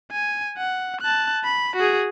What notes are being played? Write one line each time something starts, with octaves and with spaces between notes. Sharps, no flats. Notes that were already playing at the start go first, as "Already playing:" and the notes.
G#5
F#5
A5 F#6
B5
F#4 G#4